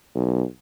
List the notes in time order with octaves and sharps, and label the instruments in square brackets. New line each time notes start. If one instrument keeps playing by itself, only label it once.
[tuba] B1